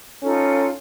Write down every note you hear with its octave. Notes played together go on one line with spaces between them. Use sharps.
C#4 D#4 F4 A4